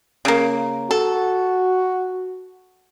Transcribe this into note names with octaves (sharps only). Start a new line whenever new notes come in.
C#3 A#3
F#4 A4